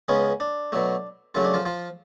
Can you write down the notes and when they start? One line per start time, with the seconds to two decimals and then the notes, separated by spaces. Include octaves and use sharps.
0.08 C#2 C#3 G#3 B3 C#4
0.40 D4
0.72 B2 F#3 A3
1.35 F#2 C#3 F#3 A3 F4
1.44 D4
1.54 F3 F4
1.65 F3 F4